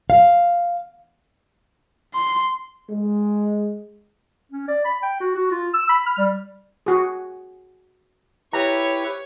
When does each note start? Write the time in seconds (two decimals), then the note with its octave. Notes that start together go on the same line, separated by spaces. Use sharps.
0.10 F5
2.14 C6
2.90 G#3
4.52 C#4
4.68 D5
4.85 B5
5.03 G5
5.21 F#4
5.35 F#4
5.51 F4
5.74 E6
5.89 B5
6.07 F6
6.18 G3
6.86 F#4 G#4
8.53 E4 G4 B4 C#5 A#5